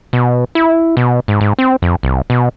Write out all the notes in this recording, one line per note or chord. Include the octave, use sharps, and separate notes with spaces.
B2
E4
B2
G#2
G#2
C4
F2
C2
B2